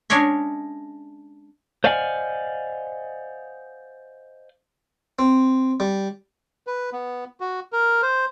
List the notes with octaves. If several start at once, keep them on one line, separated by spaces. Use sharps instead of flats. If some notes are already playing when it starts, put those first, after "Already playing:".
G#3 C#4 D4 C#5 E5
C5 D5 D#5 F5 F#5 G#5
C4
G3
B4
B3
F#4
A#4
C5